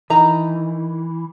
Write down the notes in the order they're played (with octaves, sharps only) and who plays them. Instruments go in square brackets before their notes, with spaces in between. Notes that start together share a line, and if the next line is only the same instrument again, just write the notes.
[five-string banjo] D#3 D#4 A#5 [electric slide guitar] E3